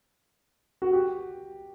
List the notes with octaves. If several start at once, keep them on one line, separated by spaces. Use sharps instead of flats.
F#4
G4